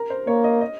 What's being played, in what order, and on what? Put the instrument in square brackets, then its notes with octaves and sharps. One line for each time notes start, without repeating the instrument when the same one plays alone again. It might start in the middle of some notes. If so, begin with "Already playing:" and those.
Already playing: [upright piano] A#4
C5
[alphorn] A#3 [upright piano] C#5
[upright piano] D#5
D#5